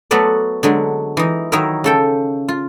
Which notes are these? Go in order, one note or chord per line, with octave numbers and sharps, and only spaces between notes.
F#3 A3 B3 F#4 B4 D5
D3 F#3 G#3
E3 D#4
D#3 F#3 D#4 E4 A#4
C#3 A4 G5
F4